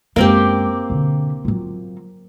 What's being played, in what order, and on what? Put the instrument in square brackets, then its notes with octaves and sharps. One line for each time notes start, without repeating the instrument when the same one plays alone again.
[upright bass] F#2 G#3 [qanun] A#3 C4 G4
[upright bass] B2 D3
F#3 F4